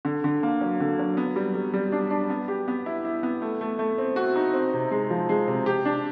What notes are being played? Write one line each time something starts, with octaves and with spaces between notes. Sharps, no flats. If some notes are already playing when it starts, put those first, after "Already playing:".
D3
D3
A#3
F#3
D3
F#3
B3
G3
G3
G3
D4
D4
B3
G4
B3
E4
E4
B3
A3
A3
A3
C4
F#4
D#4
C4
C3
G#3
F3
G#3
C3
G4
D4